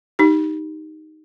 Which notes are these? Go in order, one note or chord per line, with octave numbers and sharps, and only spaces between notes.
D#4 G4